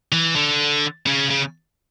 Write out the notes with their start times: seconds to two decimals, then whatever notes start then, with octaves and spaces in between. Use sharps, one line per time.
0.12 E3
0.36 D3
1.06 C#3
1.30 C#3